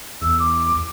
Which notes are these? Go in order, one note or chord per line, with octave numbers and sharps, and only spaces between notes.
E2 E6
D6